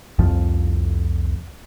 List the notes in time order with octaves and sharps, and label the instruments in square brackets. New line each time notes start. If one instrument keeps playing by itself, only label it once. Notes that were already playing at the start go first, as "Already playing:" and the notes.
[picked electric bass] C2 F2 F3